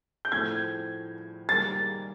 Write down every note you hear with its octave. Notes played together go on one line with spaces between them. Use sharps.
G6
A2 F3 A3 C4 G#6
D#3 G3 A#3 A6